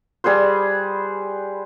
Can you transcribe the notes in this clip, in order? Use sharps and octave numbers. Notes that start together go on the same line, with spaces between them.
G3 G#4 B4 C5